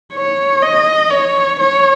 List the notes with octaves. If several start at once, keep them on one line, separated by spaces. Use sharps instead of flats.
C#5
D#5
C#5
C#5